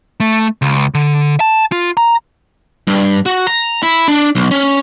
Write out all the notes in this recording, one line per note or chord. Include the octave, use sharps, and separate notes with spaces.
A3
C#2
D3
A5
F4
A#5
G2
F#4
A#5
E4
D4
B1
C#4